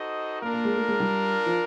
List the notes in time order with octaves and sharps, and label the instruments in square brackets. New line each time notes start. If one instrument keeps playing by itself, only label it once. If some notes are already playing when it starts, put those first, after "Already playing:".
Already playing: [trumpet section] D#4 F#4 A4 C5 D#5
[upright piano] A#3 [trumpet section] D4 F4 A#4
[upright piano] A#3
G#3
A3
G#3
G3
F3